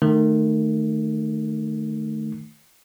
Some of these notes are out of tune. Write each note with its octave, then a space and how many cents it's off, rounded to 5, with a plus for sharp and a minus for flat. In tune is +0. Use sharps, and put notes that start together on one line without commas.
D#3 -25 A3 +0